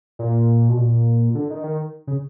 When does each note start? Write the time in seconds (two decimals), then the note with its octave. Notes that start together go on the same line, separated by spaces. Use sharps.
0.19 A#2
0.69 B2
0.77 A#2
1.35 D3
1.50 D#3
1.64 D#3
2.07 C#3